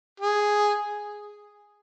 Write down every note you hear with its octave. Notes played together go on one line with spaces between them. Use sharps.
G#4